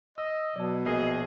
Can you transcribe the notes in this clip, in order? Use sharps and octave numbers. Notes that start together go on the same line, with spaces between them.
D#5 E6
B2 F#3 D5 A5
A#1 G#4 A#4 D#5 C7